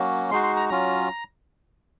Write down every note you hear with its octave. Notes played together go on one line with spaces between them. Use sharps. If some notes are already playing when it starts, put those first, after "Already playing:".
Already playing: F#3 A#3 C#4 F#4
G#3 D#4 F#4 C6
C6
A#5
F#3 C#4 F4 A#5